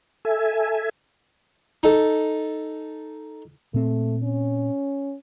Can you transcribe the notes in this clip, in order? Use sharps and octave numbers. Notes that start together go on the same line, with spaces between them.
A4 E5 G#5
D#4 A4
A#2 A3 C4
C#4